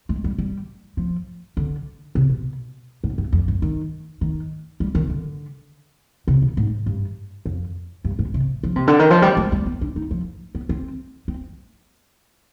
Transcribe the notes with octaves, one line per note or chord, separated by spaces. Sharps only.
G#3
G3
G3
F3
D3
C3
B2
G#2
G2
F2
G2
D#3
D#3
G3
D#3
D3
C3
B2
G#2
G2
F2
G2
G#2
C3
F3
C3
D3
D#3
F3
G3
G#3
G#3
B3
D4
D#4
F3
B3
C4
C4